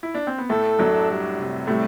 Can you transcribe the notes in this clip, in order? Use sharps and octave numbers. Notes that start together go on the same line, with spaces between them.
E4
D4
C4
B3
A2 A3 A4
F#2 F#3 D4
G3
C3
A2 G3 A3